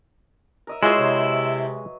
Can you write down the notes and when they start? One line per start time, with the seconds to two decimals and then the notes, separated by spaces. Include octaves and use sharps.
0.67 A#4 D#5 E5
0.83 F#3 G#3 E4 F4 G#4 B4 C5
0.98 C3